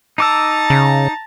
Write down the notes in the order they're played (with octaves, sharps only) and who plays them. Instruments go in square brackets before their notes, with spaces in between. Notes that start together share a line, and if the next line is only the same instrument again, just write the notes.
[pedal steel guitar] D#4 D6 E6 [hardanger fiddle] A5 A#5
[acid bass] C#3